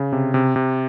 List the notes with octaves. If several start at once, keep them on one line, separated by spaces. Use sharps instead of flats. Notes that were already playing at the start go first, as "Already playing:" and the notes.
Already playing: C#3
C3
C3
C3